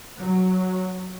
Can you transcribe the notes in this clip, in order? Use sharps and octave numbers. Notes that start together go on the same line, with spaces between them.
F#3